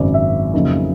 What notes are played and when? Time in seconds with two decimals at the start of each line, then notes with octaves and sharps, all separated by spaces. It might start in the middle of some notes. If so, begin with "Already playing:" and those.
Already playing: G#1 F#2 C#3 F#3 D5
0.14 E5
0.54 F2 C#3 F#3 A#3 D#4